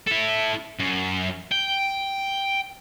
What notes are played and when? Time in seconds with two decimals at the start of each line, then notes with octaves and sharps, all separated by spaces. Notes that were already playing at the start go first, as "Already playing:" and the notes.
0.07 E4 A4
0.79 F#2
1.52 G5